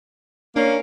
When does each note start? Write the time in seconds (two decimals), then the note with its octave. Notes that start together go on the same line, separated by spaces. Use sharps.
0.56 A#3 C#4 D4